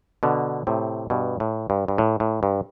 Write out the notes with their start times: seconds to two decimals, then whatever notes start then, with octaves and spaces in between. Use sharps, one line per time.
0.23 B2 D3
0.67 A2 C3
1.10 G2 B2
1.40 A2
1.70 G2
1.88 G2
1.98 A2
2.20 A2
2.43 G2